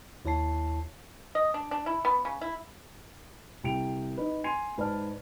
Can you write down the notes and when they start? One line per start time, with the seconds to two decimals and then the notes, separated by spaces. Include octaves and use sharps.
0.25 D#2 E4 C#5 A5 C7
1.35 D#5
1.54 D4
1.71 D4
1.86 E4
2.05 B3
2.25 C#3
2.41 E4
3.64 C2 G5 D7 F7
4.18 D#4 B4
4.44 G#5 C6 G#6 C7 D#7 F7
4.78 G#2 B4 D5 A5 F6